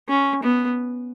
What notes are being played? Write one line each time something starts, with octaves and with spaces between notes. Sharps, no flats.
C#4
B3